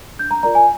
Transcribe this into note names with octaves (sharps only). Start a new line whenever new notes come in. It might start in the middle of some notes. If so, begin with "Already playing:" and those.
D4 G6
A#5
F4 A#4 D5 A#5
G#5